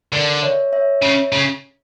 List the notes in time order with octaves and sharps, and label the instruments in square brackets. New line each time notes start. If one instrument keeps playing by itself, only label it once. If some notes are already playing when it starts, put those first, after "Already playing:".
[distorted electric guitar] D3 [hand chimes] A#4 D5
[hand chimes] C#5 E5
C#5 E5
[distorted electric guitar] C#3
C#3